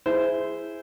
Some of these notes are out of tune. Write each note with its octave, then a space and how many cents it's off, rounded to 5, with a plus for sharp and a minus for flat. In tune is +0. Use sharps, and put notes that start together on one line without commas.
E4 +0 G#4 +0 C5 -20